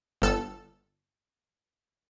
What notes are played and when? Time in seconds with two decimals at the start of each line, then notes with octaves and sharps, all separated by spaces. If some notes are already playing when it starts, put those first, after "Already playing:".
0.22 G1 A4 E6